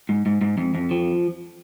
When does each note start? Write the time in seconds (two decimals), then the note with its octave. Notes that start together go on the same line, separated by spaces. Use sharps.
0.09 G#2
0.26 G#2
0.41 G#2
0.58 F2
0.75 F2
0.91 F3